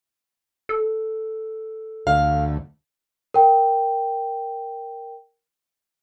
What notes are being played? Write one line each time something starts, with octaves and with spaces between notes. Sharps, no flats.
A4
D2 F5
A#4 G5